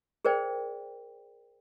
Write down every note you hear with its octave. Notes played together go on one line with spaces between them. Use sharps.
G#4 A#4 C5 D5 G5